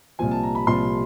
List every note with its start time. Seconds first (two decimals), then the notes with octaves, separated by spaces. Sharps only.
0.19 C2 A#2 F3 G#5
0.31 A5
0.43 A#5
0.55 B5
0.67 C2 A#2 F3 C6